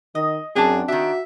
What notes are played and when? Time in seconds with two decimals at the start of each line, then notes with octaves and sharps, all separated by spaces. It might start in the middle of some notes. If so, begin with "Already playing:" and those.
0.15 D#3 D#5
0.56 F#2 C4 D4 G#4 F#5 A5
0.88 D#3 D4 F#4 E5